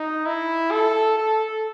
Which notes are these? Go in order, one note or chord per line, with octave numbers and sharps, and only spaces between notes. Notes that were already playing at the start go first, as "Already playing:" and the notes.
Already playing: D#4
E4
A4
A4